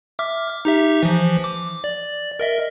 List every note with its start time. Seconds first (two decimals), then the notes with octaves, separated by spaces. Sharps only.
0.19 E5 D6 F6
0.65 D#4 G4 E5
1.03 E3 F3
1.44 D6
1.84 D5
2.39 A#4 D#5 E5